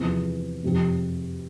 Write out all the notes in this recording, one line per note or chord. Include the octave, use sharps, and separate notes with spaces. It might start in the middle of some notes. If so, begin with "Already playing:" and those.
Already playing: E2 C3 F3 C4 E4
F2 C3 F3 C4 G4